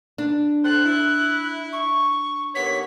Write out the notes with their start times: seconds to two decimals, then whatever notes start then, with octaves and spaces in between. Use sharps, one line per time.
0.18 D4
0.64 A3 C4 C5 F#6
0.85 E4
1.72 C#6
2.55 D#2 B3 C#5 B6